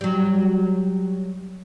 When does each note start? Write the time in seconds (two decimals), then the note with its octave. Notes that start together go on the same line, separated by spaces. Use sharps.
0.01 F#3 G3